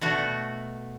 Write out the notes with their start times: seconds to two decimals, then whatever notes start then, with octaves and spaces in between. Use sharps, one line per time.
0.01 B2 A3 F#4